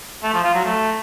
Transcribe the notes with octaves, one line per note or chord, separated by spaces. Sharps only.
A3
F3
F4
F#3
A3